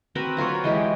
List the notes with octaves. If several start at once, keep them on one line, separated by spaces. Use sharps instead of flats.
C4 F#4 A#4 B4
F#3 F4 B4 C#5
E3 G#3 G4